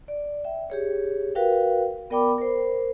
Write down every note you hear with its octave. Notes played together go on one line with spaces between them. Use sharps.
D5
E5 G5
G4 G#4 C#5
F#4 A#4 B4 F5 G5
B3 A#4 D5 G5 B5 D6
A#4 C5